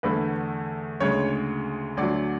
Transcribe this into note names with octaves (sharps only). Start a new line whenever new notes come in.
E2 D3 A3 B4
D2 C#3 G#3 C#5
D2 D3 F#3 D5